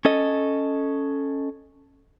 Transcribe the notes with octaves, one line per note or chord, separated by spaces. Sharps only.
C#4 A4 D#5